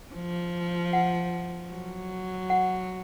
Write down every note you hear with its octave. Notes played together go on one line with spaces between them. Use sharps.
F3
F#5
F#3
F#5